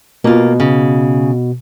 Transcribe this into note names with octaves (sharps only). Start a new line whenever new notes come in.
B2 A#3 F4
C#3